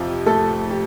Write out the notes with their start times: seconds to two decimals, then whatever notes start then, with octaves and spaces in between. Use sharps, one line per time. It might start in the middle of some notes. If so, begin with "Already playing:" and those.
Already playing: F2 C3 F3 G4
0.26 A3 A4
0.71 G4